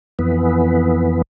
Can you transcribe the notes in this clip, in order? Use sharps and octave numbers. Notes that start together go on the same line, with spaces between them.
F2 E3 B3